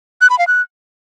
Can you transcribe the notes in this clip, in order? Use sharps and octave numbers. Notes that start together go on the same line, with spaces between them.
F#6
B5
F5
F#6